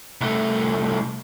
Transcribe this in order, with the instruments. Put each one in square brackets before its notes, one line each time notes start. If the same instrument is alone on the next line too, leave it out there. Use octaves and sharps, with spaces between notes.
[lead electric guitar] C2 A3